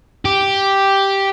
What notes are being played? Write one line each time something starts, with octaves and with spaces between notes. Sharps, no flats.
G4